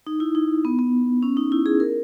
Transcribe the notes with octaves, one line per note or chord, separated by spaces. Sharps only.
D#4
E4
D#4
B3
B3
C#4
D#4
E4
G#4
A#4